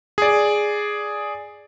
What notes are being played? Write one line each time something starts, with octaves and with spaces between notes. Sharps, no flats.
G#4 D5